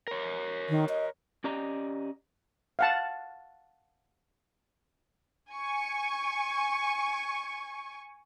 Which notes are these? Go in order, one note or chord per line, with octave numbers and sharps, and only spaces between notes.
A#4 C#5
D#3
D#5
C#4 G4 D5 D#5 A#5
F5 F#5 A5
G#5 C#6